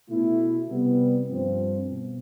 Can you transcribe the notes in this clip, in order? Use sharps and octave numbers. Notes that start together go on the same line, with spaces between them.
B2 A3 E4
C3 G3 B3
G2 F3 C4
B2